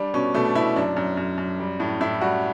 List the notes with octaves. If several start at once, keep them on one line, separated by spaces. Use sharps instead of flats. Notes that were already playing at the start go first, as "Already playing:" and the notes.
Already playing: G3 D4
B2 C#4
B2 A3
D4
B2 E4
F#2 D4
F#2
F#2
F#2
G3
A2
A2 E4
G3 F#4